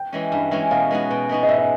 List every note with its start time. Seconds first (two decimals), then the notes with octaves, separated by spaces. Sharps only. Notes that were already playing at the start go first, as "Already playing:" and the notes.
Already playing: G5
0.12 E3 G#3 C#4
0.32 G2
0.51 E3 G#3 C#4
0.71 B2 F5
0.91 G#3 B3 D#4 F#4
1.11 B2
1.29 G#3 B3 D#4 F#4
1.43 D#5
1.49 G#2 E5
1.58 D#5